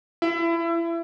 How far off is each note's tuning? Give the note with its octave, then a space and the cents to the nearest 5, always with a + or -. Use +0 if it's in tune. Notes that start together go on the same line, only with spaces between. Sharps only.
E4 +30